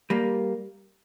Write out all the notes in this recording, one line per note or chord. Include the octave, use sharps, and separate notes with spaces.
G3 A#3